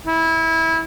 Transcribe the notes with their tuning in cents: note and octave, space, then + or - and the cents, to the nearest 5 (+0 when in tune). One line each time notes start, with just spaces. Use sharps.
E4 -20